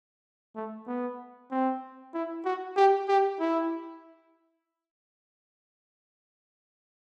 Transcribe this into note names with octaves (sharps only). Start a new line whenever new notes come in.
A3
B3
C4
E4
F#4
G4
G4
E4